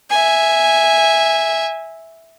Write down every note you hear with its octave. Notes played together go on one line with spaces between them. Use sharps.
E5 G#5